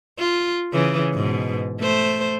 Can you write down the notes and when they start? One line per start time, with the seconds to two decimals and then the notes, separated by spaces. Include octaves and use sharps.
0.19 F4
0.73 C#3 E3
1.14 G#2 B2
1.80 A3 C5